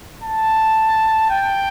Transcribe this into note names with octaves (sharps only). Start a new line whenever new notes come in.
A5
G5